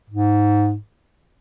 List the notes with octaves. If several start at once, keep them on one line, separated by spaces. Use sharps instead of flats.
G#2